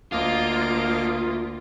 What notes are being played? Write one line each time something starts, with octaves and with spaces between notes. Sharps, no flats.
D2 A#3 F4 D#5 D6